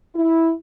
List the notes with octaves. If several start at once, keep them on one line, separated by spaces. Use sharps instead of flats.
E4